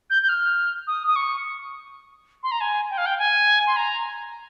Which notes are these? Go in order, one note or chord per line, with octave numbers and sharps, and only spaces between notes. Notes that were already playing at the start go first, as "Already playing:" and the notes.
G6
G6
F6
D#6
D#6
C#6
C6
A#5
G#5
G5
F5
G5
G#5
C6
A#5